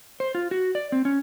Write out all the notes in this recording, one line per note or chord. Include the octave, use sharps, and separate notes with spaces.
C5
F4
F#4
D5
C4
C#4